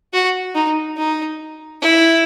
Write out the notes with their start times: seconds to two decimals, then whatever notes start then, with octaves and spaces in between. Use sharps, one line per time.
0.14 F#4
0.55 D#4
0.98 D#4
1.82 E4